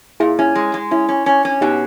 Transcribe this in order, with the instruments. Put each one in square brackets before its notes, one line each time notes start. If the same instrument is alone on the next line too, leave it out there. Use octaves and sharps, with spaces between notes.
[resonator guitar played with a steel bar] A#2 [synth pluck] E4 G#4
[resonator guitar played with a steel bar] C#4 [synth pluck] E4
[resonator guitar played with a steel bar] G#3
G#3
[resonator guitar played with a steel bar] C#4 [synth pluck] E4
[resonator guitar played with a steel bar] C#4
C#4
C#4
[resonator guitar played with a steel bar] B2 [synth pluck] D#4 G4